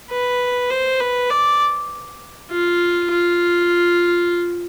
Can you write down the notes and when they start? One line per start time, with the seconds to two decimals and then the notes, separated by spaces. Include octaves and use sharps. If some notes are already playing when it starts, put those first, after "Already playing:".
0.10 B4
0.70 C5
1.01 B4
1.30 D5
2.51 F4
3.11 F4